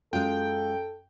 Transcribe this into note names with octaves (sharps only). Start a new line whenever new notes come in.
F#2 G#3 F4 A4 G5